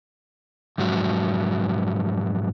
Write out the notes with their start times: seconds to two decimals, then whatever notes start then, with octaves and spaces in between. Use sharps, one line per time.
0.78 F2 G#2 F#3